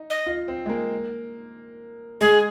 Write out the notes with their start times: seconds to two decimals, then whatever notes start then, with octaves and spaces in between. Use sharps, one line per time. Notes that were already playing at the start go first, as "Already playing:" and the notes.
Already playing: D#4
0.10 D#5
0.26 F4
0.48 C4
0.66 G#3
0.69 A#3
2.21 G#3 G#4